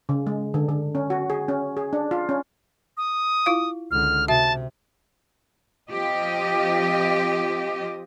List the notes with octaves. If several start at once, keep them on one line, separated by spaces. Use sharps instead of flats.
C#3
G#3
D3
D3
C#4
F#4
G#4
C#4
G#4
D4
F4
C#4
D#6
E4 F4 F5
C#2 D3 F6
C3 F#4 E5 A5
F3 C4 F4 G4 D#5